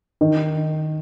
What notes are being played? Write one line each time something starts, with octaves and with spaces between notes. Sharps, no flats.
D#3